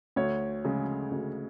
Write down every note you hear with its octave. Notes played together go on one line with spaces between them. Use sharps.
D2 C#5
C#3 G#3
D2